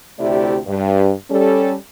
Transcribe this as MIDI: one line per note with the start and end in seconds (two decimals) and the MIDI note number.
0.19 0.59 38
0.19 0.59 48
0.19 0.59 57
0.19 0.59 64
0.19 0.59 67
0.19 0.59 74
0.67 1.11 43
1.30 1.74 55
1.30 1.74 61
1.30 1.74 69